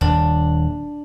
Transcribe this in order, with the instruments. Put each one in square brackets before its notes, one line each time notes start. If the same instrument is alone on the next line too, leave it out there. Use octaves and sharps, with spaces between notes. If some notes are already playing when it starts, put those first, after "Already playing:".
[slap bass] D#1 [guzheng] D4